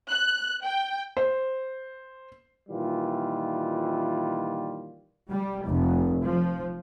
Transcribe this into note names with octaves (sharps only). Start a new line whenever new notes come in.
F#6
G5
C5
A#2 D#3 E3 G3 F4
G3
F1
F3